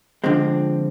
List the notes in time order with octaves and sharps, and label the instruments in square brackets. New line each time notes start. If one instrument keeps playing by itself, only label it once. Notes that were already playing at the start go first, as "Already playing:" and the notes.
[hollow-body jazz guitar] D3 F3 G#3 C4